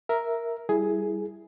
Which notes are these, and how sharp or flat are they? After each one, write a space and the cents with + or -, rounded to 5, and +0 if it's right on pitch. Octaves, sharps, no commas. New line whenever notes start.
A#4 +0 E5 +0
G3 +0 E4 +0 G#4 +10